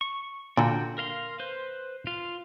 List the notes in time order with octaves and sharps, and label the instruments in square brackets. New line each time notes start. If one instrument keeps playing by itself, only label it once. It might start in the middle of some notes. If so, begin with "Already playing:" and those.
[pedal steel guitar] C#6
[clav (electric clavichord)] A#2 D3 [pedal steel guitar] D4 F#4 G5
[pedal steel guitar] A#4 F5 C6
B4 C5
F4 F5